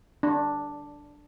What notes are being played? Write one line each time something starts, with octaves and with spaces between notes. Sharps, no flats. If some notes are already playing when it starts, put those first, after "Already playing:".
D4